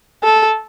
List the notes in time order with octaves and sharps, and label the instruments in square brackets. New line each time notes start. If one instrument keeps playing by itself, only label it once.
[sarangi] A4